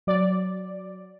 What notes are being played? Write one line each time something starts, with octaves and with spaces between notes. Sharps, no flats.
F#3 D5